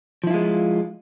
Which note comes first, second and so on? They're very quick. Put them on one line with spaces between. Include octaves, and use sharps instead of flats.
F3 E4 F4 G#3